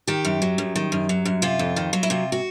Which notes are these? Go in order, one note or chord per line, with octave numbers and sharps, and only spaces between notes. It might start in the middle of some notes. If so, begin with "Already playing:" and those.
D#3 G4
F#2
F#3
F#2
D#3
F#2
F#3
F#2
C3 F4
F2
D#3
F#3
E4
C3 F4
F#4